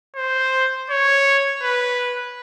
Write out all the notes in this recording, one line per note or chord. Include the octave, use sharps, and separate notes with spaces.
C5
C#5
B4